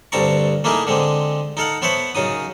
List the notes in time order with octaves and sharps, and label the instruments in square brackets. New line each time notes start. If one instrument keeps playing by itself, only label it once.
[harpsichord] D2 G2 C4 A5 A#5 C#6
A3 A#3 D#4 E4 G#4
D3 G#3 C4
D#4 A4 F5 F#5
B3 C5 C#5 E5 F#5 A5
F#2 C#3 D#4 D#6